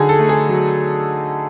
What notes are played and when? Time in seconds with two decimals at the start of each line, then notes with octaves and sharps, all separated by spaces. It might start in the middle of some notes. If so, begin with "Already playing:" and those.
Already playing: D3 F#3 D#4 G#4
0.09 A4
0.19 A3
0.29 G#4
0.49 F#3